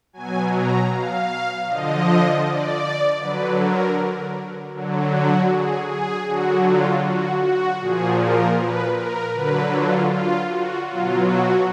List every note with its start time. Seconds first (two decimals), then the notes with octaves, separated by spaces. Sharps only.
0.13 B2 F#3 G#5
0.52 A#5
0.90 F5
1.67 D3 F3 D#5
2.44 D5
3.20 D3 F#3 B4
3.58 A#4
4.74 D3 F#3
5.12 F#4
5.50 G#4
5.89 G#4
6.27 D3 F#3 F#4
6.66 F4
7.04 F#4
7.42 F#4
7.80 A#2 F3 G#4
8.19 A#4
8.57 B4
8.96 A#4
9.34 D3 F#3 B4
9.72 F4
10.11 F4
10.49 F#4
10.87 B2 F#3 F4
11.26 F#4